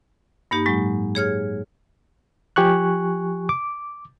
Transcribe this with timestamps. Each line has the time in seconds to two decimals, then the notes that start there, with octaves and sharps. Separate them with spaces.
0.51 G2 A#3 D#4 G4
0.66 A2 F#3 G#3
1.15 G#4 C#5 F6 G#6
2.56 F3 G4 G#5 C#6 F#6
3.49 D6